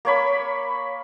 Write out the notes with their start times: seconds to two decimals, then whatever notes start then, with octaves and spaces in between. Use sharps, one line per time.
0.05 A#3 C#5 B5